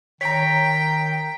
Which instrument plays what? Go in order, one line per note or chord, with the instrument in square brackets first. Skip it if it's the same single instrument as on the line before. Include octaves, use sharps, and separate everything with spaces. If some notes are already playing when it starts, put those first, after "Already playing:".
[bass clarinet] D#3 [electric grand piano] C#5 A#5 [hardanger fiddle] G5 [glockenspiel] B6